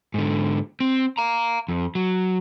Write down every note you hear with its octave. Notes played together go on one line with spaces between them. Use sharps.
G#2 D3
C4
F5 A#5
F2
F#3